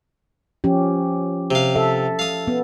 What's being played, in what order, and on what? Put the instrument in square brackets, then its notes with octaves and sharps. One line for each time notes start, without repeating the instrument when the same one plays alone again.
[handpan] F3 C#4 G4
[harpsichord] C3 F5
[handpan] A4 E5
[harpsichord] F5 D#6
[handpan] B3